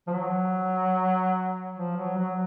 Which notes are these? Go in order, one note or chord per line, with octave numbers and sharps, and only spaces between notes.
F3
F#3
F3
F#3
F#3